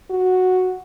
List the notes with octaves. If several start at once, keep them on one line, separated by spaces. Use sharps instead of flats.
F#4